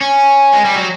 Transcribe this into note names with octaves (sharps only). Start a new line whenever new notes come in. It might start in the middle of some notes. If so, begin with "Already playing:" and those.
C#4
G#3
G3
F#3